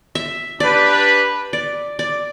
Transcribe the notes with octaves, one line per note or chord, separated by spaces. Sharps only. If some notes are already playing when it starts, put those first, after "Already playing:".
E5
D4 G4 B4 D5
D5
D5